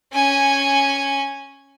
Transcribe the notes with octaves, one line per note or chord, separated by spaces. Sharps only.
C#4 G#5